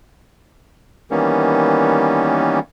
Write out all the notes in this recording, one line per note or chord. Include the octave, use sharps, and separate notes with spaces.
D#3 E3 G3 A#3 B3 C#4